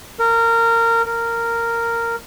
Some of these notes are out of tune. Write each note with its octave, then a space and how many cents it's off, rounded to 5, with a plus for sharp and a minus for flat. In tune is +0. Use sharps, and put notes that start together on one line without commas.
A#4 -20
A#4 -10